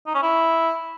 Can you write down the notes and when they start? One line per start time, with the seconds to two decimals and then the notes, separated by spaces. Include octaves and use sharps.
0.06 D#4
0.14 C#4
0.23 E4